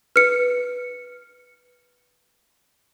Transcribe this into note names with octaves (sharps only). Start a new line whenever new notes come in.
B4 F6 C#7